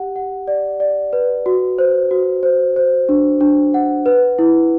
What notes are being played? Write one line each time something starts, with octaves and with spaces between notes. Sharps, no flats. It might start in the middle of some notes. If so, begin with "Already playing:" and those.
Already playing: G4 F#5
F#5
D5
D5
B4
F#4
C5
F#4
C5
C5
D4
D4
F#5
B4
E4